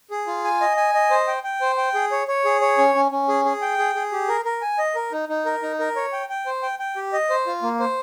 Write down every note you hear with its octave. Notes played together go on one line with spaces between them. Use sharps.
G#4
F4
G#5
D#5
G#5
D#5
C5
G5
G5
C5
G5
G#4
C#5
C#5
G#4
C#5
C#4
C#4
C#4
G#4
G#4
G5
G#4
G#4
G4
A#4
A#4
G#5
D#5
A#4
D#4
D#4
A#4
D#4
A#4
C#5
G5
G5
C5
G5
G5
G4
D#5
C5
F4
A#3
C5